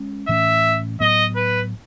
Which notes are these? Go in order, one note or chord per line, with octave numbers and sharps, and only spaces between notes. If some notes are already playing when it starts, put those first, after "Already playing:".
Already playing: G#3 C#4
A2 E3 A3 C#4 E5
A2 F#3 B3 D#5
B4